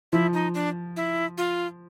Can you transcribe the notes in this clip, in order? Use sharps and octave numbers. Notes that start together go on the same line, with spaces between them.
F3 E4
D#4
D4
E4
F4